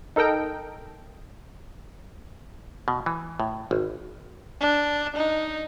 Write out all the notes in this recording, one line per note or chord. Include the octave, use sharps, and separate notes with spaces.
D#4 A4 A#4 D#5 G5
B2
E3
A2
G#1
D4
D#4